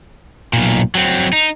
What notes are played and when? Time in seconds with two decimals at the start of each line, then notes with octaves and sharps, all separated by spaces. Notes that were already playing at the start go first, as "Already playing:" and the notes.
0.53 B1 A#2
0.95 F#3 C4
1.33 D#4